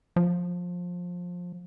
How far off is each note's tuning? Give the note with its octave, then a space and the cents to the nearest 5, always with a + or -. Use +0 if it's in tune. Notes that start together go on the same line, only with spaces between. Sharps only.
F3 +20